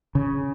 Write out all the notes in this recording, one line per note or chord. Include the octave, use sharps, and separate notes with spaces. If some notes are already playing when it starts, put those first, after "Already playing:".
C#3